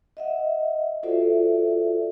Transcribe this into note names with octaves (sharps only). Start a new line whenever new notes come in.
D#5 E5 F#5
F4 F#4 A4 C5 D5 E5